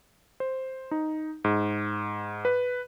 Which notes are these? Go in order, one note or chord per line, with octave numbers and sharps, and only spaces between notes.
C5
D#4
G#2
B4